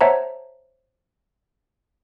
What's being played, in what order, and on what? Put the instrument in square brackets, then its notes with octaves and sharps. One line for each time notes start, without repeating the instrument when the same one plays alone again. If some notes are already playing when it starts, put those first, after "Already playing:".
[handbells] C5 C#5 E5 F#5 A5 A#5